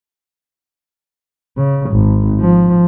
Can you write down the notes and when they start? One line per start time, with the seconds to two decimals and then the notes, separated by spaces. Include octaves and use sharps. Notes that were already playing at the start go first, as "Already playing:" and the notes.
1.57 C#3
1.90 G#1
2.39 F3